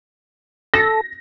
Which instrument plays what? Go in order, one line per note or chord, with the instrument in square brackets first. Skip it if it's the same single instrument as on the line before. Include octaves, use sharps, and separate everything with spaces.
[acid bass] A4 [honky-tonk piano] A#6